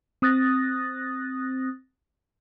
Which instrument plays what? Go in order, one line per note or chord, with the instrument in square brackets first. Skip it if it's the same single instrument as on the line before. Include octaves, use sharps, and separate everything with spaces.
[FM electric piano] C4 D#6 F#6 A6 A#6